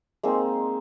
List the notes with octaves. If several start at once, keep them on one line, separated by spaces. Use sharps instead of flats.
G#3 A#3 C4 D#4